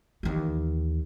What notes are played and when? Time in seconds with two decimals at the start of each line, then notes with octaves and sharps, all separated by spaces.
0.23 D#2 E3